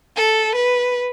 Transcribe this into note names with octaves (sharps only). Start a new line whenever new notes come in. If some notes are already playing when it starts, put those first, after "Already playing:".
A4
B4